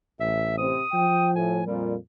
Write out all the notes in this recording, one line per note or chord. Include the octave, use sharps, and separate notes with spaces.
A1 E5
C3 C4 D#6
F3 G5
A2 G#5
F2 A#2 G3